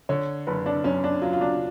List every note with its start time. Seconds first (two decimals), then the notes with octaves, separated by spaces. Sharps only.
0.09 D3 C#5
0.47 F#1 B4
0.66 D4
0.84 F#2 C#4
1.04 D4
1.22 F#3 F4
1.33 F4
1.41 D4